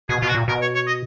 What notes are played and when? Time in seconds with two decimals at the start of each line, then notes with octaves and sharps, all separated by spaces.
0.09 B2 G#4
0.21 B2 F4
0.28 F#4
0.35 A#2
0.48 B2 A#4
0.61 C#5
0.75 C#5
0.87 D#5